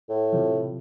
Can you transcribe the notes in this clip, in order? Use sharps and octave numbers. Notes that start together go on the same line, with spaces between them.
A2
C3 F3